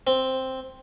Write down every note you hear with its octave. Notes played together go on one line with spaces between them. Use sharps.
C4